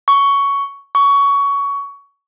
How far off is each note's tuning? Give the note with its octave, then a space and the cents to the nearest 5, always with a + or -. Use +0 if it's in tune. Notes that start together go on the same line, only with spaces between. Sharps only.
C#6 +10
C#6 +20